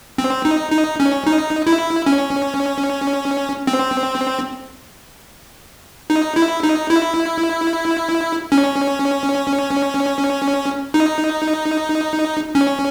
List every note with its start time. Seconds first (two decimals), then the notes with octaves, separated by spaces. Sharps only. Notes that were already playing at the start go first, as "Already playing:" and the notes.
0.18 C4
0.45 D#4
0.72 D#4
1.00 C#4
1.26 D#4
1.67 E4
2.06 C#4
3.67 C4
6.10 D#4
6.36 E4
6.63 D#4
6.90 E4
8.52 C#4
10.94 D#4
12.55 C#4